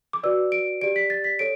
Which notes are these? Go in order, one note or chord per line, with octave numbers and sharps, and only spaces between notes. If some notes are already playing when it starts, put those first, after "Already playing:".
D6
F#4 B4 D5 E6
D7
G4 D5 D7
B6
A6
B6
A4 C#5 D7